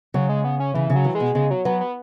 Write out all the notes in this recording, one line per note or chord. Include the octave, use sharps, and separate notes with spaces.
C#3 F#3
G#3
B3
C#4
C#3 E3
C#3
F#3
E3
G#3
B2
C#3 G#3
F#3
F#3 B3
B3